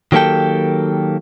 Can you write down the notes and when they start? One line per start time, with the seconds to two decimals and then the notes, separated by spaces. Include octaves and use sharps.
0.12 D#3 F#3 A#3 G4 A4 G5